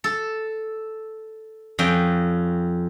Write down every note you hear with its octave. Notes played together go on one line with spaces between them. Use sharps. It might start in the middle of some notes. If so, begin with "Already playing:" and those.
A4
F2 C#4 G5